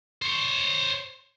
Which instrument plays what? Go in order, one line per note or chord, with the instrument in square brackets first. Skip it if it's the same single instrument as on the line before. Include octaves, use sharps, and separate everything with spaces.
[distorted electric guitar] C5 C#5